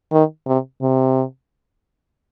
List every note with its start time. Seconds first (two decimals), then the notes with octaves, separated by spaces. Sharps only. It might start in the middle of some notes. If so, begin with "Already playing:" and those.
0.12 D#3
0.47 C3
0.82 C3